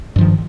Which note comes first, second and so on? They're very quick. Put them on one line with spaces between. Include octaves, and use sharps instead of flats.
G2 F3 D#3